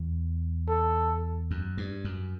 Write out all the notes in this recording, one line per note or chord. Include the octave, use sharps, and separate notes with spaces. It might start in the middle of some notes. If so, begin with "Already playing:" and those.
Already playing: E2
A4
F#2
G2
F#2